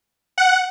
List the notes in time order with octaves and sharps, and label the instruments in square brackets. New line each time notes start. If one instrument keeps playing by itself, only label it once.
[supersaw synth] F#5